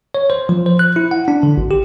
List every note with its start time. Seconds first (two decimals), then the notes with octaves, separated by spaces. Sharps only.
0.15 C#5
0.30 C5
0.49 F3
0.66 C5
0.79 F#6
0.96 E4
1.11 F#5
1.28 D4
1.43 D3
1.57 G#1
1.71 G4